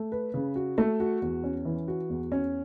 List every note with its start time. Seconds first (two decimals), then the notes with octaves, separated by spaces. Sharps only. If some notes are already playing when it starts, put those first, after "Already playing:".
Already playing: A3
0.12 B4
0.34 C#3
0.56 F#4
0.78 A3
1.00 F#4
1.22 E2
1.44 C#4
1.65 E3
1.88 F#4
2.09 E2
2.32 C#4